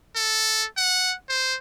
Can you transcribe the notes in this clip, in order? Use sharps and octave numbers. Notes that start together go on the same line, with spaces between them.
A4
F#5
C5